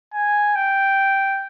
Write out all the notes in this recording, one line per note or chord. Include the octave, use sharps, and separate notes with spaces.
G#5
G5